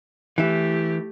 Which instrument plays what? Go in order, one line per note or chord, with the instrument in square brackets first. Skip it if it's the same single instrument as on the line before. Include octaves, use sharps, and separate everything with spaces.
[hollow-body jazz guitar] E3 E4 [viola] A3 G4